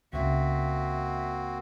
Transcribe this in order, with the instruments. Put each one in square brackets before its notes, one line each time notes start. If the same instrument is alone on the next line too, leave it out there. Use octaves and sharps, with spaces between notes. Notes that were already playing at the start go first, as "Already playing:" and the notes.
[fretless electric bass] C#2 C#3 [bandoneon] A#3 C4 F#4 [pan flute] E5